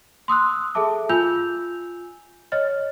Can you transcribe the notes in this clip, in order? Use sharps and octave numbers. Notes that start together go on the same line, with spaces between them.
C6 D#6 E6 F#6
G#4 A4 E5 A5 D6
F4 G#5 E6 G6 F7
C#5 D#5 F6 A6